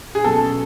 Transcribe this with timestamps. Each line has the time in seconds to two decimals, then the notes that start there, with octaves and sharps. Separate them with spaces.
0.15 G#4
0.24 B2 F#3 A3 C#4 F#4 A4